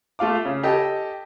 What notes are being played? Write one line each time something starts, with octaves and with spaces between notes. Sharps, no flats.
A3 F4 F5 D6
C#3
G4 A4 D#5